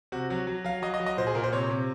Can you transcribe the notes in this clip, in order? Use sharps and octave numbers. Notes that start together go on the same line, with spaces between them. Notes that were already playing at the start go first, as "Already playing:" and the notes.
C3 F#4
F#3 F#4
F#3
F#3 F5
F#3 D#5
D#5
F#3
D#5
A#2 C5
G#4
A#2 A#4
C5
C3 C#5
C3